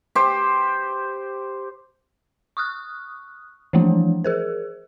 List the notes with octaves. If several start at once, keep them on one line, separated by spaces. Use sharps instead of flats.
G4 C5
C#6 D#6 F6 F#6
E3 F3 A3 A#3 D4 E4
G#4 A#4 C5